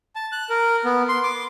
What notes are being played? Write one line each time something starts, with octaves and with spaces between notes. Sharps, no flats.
A5
F#6
A#4
B3
C6
D6